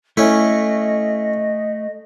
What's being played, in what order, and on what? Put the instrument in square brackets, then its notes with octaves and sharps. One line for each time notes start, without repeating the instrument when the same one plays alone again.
[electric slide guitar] A3 [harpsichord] C#4 E4 [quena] D#5